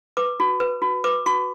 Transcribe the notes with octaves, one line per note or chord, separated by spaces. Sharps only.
B4 D6
F#4
B4
F#4
B4 D6
F#4 C#6